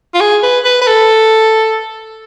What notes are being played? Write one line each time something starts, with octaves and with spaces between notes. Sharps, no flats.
F4
G#4
B4
B4
B4
A4